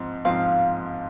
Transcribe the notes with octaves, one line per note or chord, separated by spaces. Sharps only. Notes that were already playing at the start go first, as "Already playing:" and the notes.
Already playing: G#2 F3 C4
G#2 F3 C4 F5